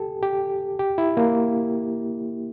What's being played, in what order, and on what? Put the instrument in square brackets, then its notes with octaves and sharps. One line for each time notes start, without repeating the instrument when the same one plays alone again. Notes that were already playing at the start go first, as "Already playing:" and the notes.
Already playing: [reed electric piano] G4 A4
G4
G4
E4
A#3